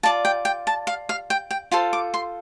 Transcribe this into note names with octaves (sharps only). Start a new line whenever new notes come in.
F4 D5 A5
G5
G5
A5
F5
F5
G5
G5
F4 A4 C5 C6
D6
C6